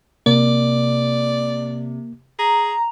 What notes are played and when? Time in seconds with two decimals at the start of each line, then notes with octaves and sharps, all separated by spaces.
0.26 C3 A#3 D5
2.39 G#4 A#5